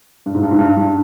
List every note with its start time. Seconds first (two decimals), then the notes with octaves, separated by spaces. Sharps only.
0.26 G2
0.35 G#2
0.43 G2
0.51 G#2
0.59 G2
0.77 G2